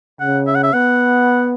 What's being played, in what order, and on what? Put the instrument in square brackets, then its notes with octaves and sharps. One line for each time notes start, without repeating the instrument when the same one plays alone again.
[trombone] C#3 [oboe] F#5
[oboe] E5
F#5
E5
[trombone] B3 [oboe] F#5